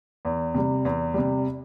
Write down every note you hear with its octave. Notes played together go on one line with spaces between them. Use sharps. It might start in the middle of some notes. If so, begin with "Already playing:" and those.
E2
C3 G3
E2
C3 G3